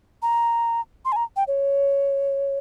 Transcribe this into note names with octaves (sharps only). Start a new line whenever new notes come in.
A#5
C6
G#5
A#5
G5
C#5